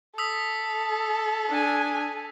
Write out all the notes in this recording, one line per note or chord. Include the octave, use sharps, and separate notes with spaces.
A4 D#6 E6 B6
D4 G#5